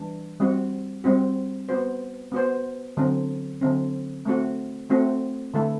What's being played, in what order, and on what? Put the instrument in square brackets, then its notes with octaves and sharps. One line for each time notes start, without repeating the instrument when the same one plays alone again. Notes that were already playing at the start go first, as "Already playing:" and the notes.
Already playing: [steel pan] E3 G3 D4
G3 C4 F#4
G3 C4 F#4
B3 F#4 C5
B3 F#4 C5
D3 F#3 C4
D3 F#3 C4
A3 C4 F#4
A3 C4 F#4
D3 A3 E4 A4